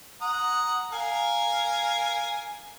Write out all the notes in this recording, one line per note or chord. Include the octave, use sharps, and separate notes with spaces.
F#5 A#5 D#6
A#4 F5 G#5